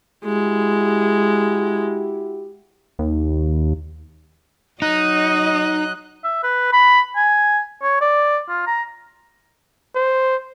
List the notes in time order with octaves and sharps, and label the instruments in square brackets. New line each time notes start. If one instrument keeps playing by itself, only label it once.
[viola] G#3 [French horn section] E4 F#4 G4
[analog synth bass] D#2
[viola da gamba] F#3 D#5 [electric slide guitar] D#4 [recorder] F#6
[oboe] E5
B4
B5
G#5
C#5
D5
F4
A#5
[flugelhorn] C5